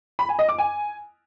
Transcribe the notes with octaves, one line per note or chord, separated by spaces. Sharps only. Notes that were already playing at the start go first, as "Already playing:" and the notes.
B5
G#5
D#5
D6
G#5